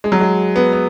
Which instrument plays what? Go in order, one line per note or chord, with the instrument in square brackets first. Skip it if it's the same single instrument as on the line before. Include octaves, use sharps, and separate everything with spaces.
[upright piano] G#3
F#3
G#3
B3
B3